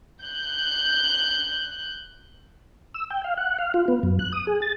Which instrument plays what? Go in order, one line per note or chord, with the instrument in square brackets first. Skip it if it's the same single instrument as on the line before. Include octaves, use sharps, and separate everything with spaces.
[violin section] F#6 G6
[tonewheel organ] E6
G5
F5
F#5
F5
F4
B3
F#2
F#6
D#6
G#4
A6